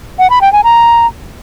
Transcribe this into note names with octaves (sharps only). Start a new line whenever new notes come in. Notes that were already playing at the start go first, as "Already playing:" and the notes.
F#5
B5
G5
G#5
A#5